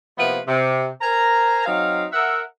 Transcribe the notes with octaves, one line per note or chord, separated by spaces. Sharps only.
C3 F3 A#3 B3 E4 B4
C3
A#4 C5 G#5 A#5
F#3 C4 D#4 F5
A#4 E5 F#5